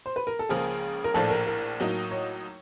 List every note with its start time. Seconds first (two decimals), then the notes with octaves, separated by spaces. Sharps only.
0.06 C5
0.16 B4
0.27 A#4
0.39 A4
0.49 C#2 C#3 F3 A#3 G#4
1.04 A#4
1.14 A#1 A2 F3 A#3 D4 A4
1.30 A#4
1.47 A#4
1.80 A2 F#3 A#3 D#4
2.11 C#5